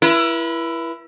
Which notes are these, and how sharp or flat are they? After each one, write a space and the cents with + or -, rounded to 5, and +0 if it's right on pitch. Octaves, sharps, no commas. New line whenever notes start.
E4 +20 B4 -40